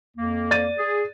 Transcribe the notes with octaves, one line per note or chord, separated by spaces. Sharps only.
F2 A#3
D5 A6 D#7
G#4